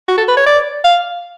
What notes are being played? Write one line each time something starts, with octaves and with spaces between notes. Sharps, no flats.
F#4
A4
B4
C#5
D5
F5